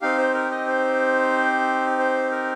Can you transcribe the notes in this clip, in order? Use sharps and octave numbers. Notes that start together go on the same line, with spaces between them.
C4 D#4 G4 F5
C5
A#4
D#5
C5
C5
A#4